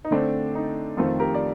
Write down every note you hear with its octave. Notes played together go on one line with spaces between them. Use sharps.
D#4
D3 A3 C4 D4
D#4
F2 D#3 A3 C4 F4 A4
G4 A#4
D5